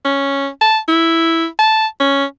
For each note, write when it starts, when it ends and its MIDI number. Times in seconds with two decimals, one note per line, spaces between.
0.05 0.48 61
0.61 0.78 81
0.88 1.47 64
1.59 1.87 81
2.00 2.25 61